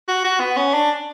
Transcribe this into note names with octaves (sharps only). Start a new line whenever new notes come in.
F#4
F#4
B3
C#4
D4